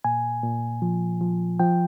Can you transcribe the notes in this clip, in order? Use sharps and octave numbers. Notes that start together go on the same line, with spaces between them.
A#2 G#5
A#2
F3
F3
F3 G5